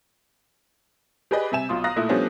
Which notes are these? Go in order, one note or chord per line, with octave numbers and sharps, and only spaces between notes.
G4 G#4 B4 D5 D#5
C3 G3 E5 G#5 E7
B1 F4 C6 D#6
F5 A#5 D#6 F#6 A#6
A#2 A3 E4
F3 G3 A3 B3 C#4 D4